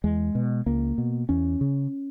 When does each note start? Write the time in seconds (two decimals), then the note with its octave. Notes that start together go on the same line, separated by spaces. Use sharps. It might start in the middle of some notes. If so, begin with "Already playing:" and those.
0.04 E2 G#3
0.35 B2
0.66 C#2 A#3
0.98 B2
1.29 E2 C#4
1.61 C#3